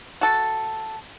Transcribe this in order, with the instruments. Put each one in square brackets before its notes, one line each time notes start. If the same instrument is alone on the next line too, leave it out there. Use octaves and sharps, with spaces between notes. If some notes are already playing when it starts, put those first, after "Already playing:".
[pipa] F#4 A4